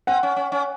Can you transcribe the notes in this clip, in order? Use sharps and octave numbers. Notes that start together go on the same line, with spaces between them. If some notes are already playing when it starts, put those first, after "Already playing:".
C4 F#5
C#4
C#4
C#4